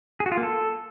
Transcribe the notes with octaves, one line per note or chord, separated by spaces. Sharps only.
G#4
F#4
F4
A#3
A4